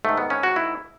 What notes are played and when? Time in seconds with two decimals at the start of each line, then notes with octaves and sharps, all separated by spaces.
0.05 G#2 D#3 A3
0.18 B3
0.30 C#4
0.43 F#4
0.56 E4